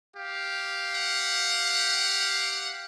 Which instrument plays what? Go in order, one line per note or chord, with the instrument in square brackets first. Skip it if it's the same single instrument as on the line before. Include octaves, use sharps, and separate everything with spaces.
[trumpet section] G4 F5
[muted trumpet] F#5